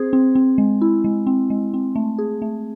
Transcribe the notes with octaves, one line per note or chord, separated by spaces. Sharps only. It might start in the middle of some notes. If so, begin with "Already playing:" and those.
Already playing: C4 G#4 C5
C4
C4
G#3
E4
G#3
C4
G#3
C4
A3
G#4
A3